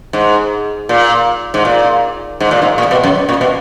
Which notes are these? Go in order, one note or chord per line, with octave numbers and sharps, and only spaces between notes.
G#2
A#2
G#2
A#2
G#2
A#2
G#2
A#2
B2
F#2
A#2
B2